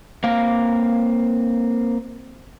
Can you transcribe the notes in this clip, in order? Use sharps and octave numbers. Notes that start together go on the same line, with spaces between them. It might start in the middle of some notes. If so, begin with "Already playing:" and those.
A#3 C4 F5